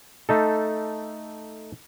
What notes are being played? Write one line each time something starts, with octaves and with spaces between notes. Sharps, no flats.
A3 D#4 A4